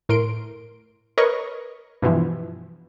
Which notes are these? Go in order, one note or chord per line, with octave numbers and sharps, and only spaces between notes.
A2 A#4 C6 D7
A#4 B4 C#5 D#5 C#6
G2 B2 E3 F3